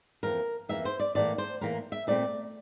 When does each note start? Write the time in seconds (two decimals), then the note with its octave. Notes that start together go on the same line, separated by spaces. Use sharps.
0.23 F2 E3 A#3 A#4
0.69 F2 E3 A#3 E5
0.85 C5
0.99 D5
1.15 A2 E3 A#3 D5
1.38 C5
1.61 A2 E3 A#3 A#4
1.92 E5
2.07 A#2 A3 C4 D5